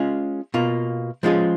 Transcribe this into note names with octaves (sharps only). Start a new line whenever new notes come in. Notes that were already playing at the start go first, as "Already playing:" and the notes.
Already playing: G#3 C#4 F4 G#4
B2 A#3 F4
F3 G#3 C#4 F4 G#4